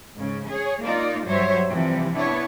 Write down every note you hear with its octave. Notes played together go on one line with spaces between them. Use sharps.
G#2 C#3
G#4 C#5
A#3 D#4 F4 D5
G2 F#3 G3 C5 C#5 E5
C3 E3 F3 G3
B3 D4 E4 C#5